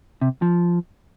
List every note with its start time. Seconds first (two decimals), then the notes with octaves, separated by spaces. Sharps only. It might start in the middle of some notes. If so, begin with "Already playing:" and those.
0.22 C3
0.42 F3